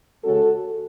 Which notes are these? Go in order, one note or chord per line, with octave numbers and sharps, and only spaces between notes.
C#3 G#3 C#4 F#4 A4